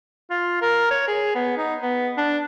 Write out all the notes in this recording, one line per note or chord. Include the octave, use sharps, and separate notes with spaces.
F4
A#4
C#5
G#4
B3
D#4
B3
D4